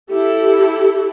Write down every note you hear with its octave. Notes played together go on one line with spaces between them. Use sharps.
E4 G4 A4